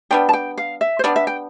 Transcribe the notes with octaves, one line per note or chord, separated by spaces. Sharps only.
G3 B3 D4 G5
A5
G5
F5
E5
C5
G3 B3 D4 D5
E5
G5